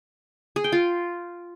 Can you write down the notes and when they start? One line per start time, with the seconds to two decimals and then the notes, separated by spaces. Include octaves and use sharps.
0.56 G#4
0.64 G5
0.72 F4